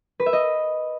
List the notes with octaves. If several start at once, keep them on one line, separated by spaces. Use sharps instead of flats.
B4
E5
D#5